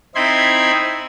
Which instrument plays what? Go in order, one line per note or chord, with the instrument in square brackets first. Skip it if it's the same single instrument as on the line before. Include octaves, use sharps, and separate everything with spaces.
[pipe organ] C4 D#4 E4 B5 C6 G#6